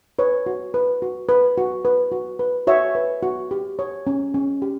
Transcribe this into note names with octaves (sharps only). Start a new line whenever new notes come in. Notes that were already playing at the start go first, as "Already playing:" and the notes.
B4 C#5
F#4
B4
F#4
B4
F#4
B4
F#4
B4
F#4 C#5 E5
B4
F#4
G4
C#5
C#4
C#4
G4